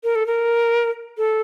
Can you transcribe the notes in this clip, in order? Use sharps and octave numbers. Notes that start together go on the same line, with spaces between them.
A#4
A4
A#4
A4